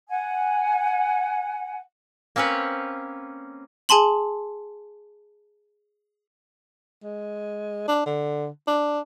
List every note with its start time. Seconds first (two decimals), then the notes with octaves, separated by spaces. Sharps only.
0.08 F#5 G#5
2.36 A#3 C4 C#4 B4 C#5
3.89 G#4 G#5 A5 C6 F#7
7.03 G#3
7.88 D4
8.06 D3
8.67 D4